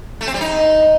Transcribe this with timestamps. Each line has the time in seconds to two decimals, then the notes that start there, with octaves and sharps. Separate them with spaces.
0.21 A3
0.27 C4
0.34 G3
0.41 D#4